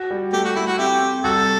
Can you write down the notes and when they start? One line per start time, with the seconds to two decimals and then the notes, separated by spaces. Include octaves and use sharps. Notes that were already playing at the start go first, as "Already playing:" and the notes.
Already playing: F#4
0.10 G3
0.33 A3 G4
0.44 F#4
0.55 A3 E4
0.67 F#4
0.78 C4 E4 G4
1.01 C4
1.23 C2 F#4 A4